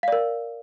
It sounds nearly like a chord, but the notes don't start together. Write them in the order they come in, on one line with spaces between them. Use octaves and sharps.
F5 D5 A#4